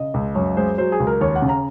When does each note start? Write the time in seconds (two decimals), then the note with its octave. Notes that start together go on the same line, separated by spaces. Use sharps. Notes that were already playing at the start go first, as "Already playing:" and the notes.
Already playing: C#3 D#5
0.14 C#2
0.35 F#2 C#5
0.57 G#3 C5
0.78 F#3 C5
0.92 G#4
1.00 C#2
1.07 A#4
1.21 D#2 C#5
1.35 F#5
1.42 C#3
1.49 A#5